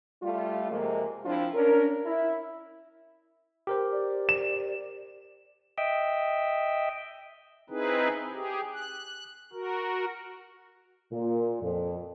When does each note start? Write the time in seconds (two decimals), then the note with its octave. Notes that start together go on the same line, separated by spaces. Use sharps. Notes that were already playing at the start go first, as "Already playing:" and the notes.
0.23 G3 A3 F4
0.71 F2 C3 G#3 A#3
1.25 F3 C4 D4 E4 F4
1.54 C#4 D4 A#4
2.06 E4
3.67 G4 A#4 C5
3.92 D5
4.29 E7
5.78 D#5 E5 G5
7.70 C4 D#4 E4 G#4 B4
8.32 G4 G#4
8.74 F#6
9.53 F#4 A#4
11.12 A#2
11.61 F2